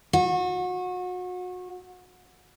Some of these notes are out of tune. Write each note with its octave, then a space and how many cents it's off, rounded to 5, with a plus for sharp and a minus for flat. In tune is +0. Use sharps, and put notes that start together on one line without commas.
F#4 -30